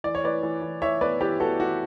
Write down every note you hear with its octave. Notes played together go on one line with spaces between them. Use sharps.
E3 D5
C#5
E3 B4 D5
E3
E3
E3 C#5 E5
B3 B4 D5
E3 G4 B4
B3 F#4 A4
E3 F#4